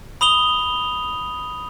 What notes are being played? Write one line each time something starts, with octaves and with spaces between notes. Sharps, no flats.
B5 D#6 F7 G7